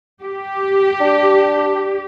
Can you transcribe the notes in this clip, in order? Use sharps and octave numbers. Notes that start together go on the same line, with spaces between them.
G4
D4